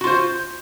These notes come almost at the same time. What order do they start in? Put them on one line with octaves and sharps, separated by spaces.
F#4 F4 C5